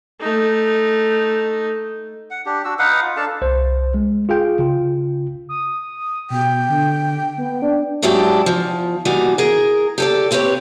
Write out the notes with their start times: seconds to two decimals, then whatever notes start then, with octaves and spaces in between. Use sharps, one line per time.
0.21 A3 D#4
2.30 F#5
2.46 D4 G4
2.65 D4 F#4 E6
2.79 D#4 B4 F5 F#5
3.02 F4
3.17 D4 A4 F5 A5
3.42 C2 C5
3.94 G#3
4.29 F4 G#4 F5 G5
4.59 C#3 F4
5.49 D#6
6.30 B2 G5
6.69 D3
7.38 B3
7.62 D4
8.02 G#2 F#3 D4 E4 G4 A5
8.46 E2 F3
9.05 E3 G3 A#3 B3 D#4 F#4
9.38 G#4 A#4
9.98 G4 A4 D5
10.31 C4 E4 G4 B4 C#5